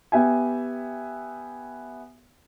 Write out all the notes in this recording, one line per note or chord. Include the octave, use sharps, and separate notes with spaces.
B3 G4 E5 G5 G#5